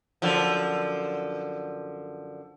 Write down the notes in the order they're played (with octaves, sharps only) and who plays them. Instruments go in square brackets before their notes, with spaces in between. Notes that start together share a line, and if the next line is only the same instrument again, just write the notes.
[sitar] F#2 D3 F3